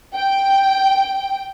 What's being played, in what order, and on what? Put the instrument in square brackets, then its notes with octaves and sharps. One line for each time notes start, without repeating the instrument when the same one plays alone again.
[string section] G5